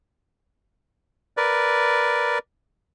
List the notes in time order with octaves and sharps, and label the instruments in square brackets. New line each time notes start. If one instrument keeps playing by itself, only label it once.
[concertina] A#4 B4 D5